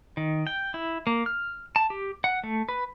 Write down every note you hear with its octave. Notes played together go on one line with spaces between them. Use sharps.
D#3
G5
E4
A#3
F6
A5
G4
F#5
A3
B4